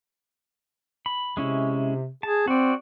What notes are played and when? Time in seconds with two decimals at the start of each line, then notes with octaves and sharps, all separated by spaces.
1.06 B5
1.37 C3 G#3 C#4 E4
2.23 G#4 A5
2.48 C4 F#4 D5